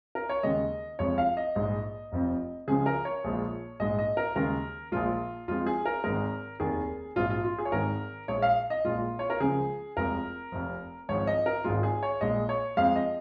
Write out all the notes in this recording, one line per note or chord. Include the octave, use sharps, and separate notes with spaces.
A#4
C#5
D#2 C#3 G#3 D#5
F1 F2 F3 G#3 C#5
F5
D#5
A#1 G#2 G#3
F1 F2 F3
C#2 C#3 F3 G#3 G#4
A#4
C#5
A#1 A#2 F3 G#3
A#1 G#2 G#3 D#5
D#5
A#4
D#2 C#3 G#3 A#4
A#1 A#2 F3 G#3 F4
F2 F3 G#3 F4
G#4
A#4
G#1 G#2 G#3 A#4
F1 D#2 D#3 G#4
A#1 G#2 F3 F4
F4
F4
G#4
C#5
G#1 G#2 D#3 G#3 A#4
A#1 A#2 G#3 C#5
F5
D#5
A#1 A#2 G#3 F4
C#5
A#4
C#2 C#3 F3 G#3 G#4
F1 F2 F3 G#3 A#4
F1 F2 F3
G#1 G#2 F3 C#5
D#5
A#4
G#1 G#2 G#3 F4
G#4
C#5
A#1 A#2 G#3 D#5
C#5
F2 F3 G#3 F5
D#5